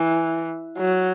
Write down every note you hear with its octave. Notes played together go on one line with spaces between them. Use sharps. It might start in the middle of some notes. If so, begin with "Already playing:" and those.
Already playing: E3
F#3